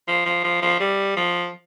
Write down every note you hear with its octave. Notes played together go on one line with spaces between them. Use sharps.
F3
F3
F3
F3
G3
F3